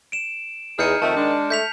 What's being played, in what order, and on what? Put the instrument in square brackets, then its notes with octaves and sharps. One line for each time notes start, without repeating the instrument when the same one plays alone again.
[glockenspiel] D7 E7
[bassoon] E2 [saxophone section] D#4 G#4 [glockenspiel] F6 G6 C#7
[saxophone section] F2 A3 [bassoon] D#3 [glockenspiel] A5
[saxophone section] G#3 D4
[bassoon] A3 [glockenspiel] G6 B6 F7